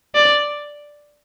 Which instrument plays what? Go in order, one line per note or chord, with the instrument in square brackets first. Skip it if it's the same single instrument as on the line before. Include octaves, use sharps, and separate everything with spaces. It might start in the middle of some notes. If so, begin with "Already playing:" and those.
[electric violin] D5